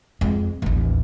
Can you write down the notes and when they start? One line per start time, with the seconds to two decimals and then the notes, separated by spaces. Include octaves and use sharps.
0.21 F2 G#3
0.62 A1 D#2